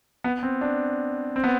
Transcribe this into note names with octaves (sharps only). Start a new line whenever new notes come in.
B3
C4
D4
C4
B3